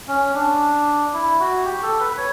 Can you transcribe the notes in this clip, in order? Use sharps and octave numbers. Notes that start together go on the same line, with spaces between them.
C#4
D4
E4
F#4
G4
A4
B4
B4
C#5